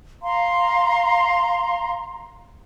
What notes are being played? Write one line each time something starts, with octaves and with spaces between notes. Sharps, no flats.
F5 A#5 C6